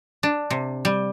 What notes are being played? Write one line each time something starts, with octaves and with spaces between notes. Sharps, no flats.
D4
C3
G3